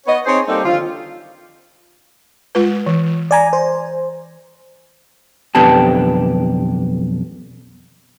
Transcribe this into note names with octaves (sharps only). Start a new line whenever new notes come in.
B3 C#5 D#5
C4 D#4 G#4 C5 C#5
G3 A#3 C4 D#4 G4 A4
D3 D#3 F3 F4
G#3 F4 B4
E3
D5 G#5 A#5
C5
B1 F2 B3 D4 G4 A5